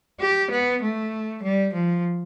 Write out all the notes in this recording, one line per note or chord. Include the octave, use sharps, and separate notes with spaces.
G4
B3
A3
G3
F3